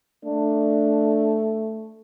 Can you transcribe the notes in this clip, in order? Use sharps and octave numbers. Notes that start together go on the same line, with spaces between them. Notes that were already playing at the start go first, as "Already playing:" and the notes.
A3 D4